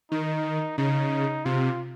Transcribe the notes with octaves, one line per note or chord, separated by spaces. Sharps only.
D#3 D#4
C#3 D#4
C3 F4